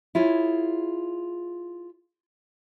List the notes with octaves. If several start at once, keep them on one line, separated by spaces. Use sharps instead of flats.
E4 F4 G#4 C#5